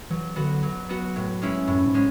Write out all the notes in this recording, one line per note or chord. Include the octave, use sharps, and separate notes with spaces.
E3 F#3
D3 B3 F#4
F#3
B3 F#4
A2
G#3 C#4 E4
F#2 A2
G#2
G#3 C#4